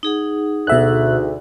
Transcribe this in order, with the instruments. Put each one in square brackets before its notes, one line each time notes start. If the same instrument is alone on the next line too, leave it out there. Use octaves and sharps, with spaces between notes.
[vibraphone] D#4 G#4 F#5
[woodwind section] D2 [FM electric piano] B2 E5 F#6